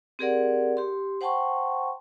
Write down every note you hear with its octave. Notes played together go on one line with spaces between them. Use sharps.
C4 G4 G#4 A#4 D5 F#5
G4 C6
C5 F#5 G5 A5 C6 C#6